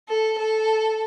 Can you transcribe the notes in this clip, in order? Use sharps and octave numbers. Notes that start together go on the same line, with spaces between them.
A4
A4